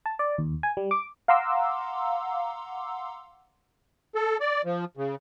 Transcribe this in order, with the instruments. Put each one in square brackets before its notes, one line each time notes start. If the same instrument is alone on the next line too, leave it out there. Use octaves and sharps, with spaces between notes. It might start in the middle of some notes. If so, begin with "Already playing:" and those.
[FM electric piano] A5
D5
D#2
G#5
G3
D6
F5 F#5 A#5 C6 D6 E6
[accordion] A4
D5
F3
C#3